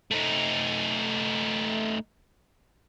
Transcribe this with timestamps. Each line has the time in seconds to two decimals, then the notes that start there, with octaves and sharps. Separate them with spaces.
0.11 A3 D#4